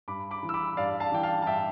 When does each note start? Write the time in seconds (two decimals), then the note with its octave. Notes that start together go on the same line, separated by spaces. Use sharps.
0.08 G2 B5 D6
0.31 B5 D6
0.43 E3
0.49 E6
0.54 B5 D6
0.77 G2 D5 F5
1.00 F5 A5
1.12 E3 G5
1.23 F5 A5
1.42 A5
1.46 G2 E5 G5